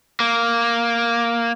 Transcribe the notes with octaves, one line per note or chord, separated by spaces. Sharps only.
A#3